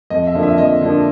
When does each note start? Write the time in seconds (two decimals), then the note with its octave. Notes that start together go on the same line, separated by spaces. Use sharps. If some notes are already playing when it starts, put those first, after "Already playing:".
0.10 F2 D#5
0.27 E5
0.34 D3 F3 A#3 D4
0.43 E5
0.58 F2 D#5
0.81 D3 F3 A#3 D4